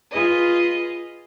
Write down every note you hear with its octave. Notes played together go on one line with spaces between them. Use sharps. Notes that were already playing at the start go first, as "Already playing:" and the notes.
F4 G#4 B4 D#5